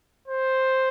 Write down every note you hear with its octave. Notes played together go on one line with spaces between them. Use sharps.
C5